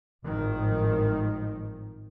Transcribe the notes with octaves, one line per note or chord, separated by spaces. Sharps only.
G#1 A2 D#3 F3